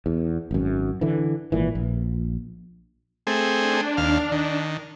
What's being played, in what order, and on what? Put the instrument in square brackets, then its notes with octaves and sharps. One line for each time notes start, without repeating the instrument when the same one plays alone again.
[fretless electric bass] E2
G#1 F#2
D3 E3
G#1 A#2 E3
A#1
[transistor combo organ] A3 C4 G#4
[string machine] D4
[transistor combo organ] D#2 F5
D#3